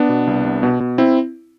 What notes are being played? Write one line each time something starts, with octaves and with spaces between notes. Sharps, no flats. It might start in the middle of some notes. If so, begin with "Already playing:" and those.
Already playing: B3 D4
B2
C2
C2
B2
B2
C4 E4